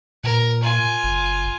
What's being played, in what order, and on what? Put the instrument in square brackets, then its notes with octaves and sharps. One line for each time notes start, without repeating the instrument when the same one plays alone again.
[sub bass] A#2 [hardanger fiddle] A#4
[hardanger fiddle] F4 G#5
[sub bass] F#1